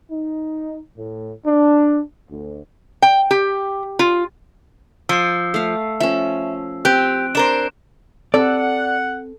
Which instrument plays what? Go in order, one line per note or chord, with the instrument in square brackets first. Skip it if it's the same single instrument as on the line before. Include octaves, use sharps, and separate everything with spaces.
[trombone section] D#4
A2
D4
D2
[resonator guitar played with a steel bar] G5
G4
F4
[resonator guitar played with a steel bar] F3 [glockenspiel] E6 C7
[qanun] A3 F5
[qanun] F3 C#4 [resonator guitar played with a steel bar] E5
[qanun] C4 [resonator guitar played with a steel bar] G4 [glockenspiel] F#6 D7
[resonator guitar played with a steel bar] D4 A#4 C5 [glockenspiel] E7
[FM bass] C4 [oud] A4 [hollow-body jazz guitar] D5 [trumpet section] F#5